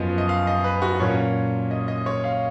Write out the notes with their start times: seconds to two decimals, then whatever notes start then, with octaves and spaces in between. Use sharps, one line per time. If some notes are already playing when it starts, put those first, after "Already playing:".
Already playing: F#2 F3 B3 D#5
0.18 D#5
0.29 F5
0.47 D#5
0.64 B4
0.82 F#4
1.00 A#2 F#3 C#4 C#5
1.71 D#5
1.88 D#5
2.06 C#5
2.24 F5